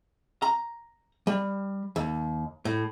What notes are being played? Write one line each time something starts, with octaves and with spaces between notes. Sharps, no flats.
A#5
G3
D#2
A2